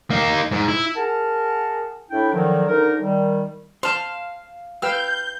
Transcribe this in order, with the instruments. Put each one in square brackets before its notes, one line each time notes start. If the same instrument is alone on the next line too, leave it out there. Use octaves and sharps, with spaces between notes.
[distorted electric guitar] A#3 D#4
G#2
E4
[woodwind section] G#4 A#4 F#5 A5
A2 D4 E4 G5
D3 D#3 F3 F#3
D2 D#4 A#4
D#3 G3
[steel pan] C5 [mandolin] F5 [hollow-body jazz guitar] A5 C6
[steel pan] B4 G5 E6 [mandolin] F5 [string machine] G6